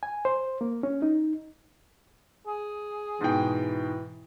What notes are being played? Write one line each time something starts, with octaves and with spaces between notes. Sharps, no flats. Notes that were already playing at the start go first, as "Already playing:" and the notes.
G#5
C5
A#3
C#4
D#4
G#4
G#2 B2 E3 G5